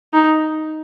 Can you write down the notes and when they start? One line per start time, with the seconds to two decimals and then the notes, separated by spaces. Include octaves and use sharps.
0.14 D#4